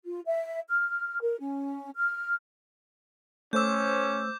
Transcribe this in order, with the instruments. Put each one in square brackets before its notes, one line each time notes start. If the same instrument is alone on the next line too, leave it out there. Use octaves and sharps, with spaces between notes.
[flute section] F4
E5
F6
A#4
C#4
F6
[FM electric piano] A3 C5 E6 [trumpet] C#4 [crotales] D6 G6